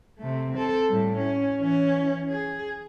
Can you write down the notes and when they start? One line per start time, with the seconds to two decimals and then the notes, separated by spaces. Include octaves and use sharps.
0.18 C3 A3
0.53 C4 A4
0.88 A2 G3
1.18 C#4
1.59 E3 C#4
2.30 G#4